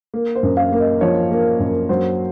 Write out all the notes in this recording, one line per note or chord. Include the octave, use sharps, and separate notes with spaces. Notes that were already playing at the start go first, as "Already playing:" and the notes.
A#3
C5
F#2
F5
A#3
D#5
F3 C#5
A#3
F#2
F#3 C5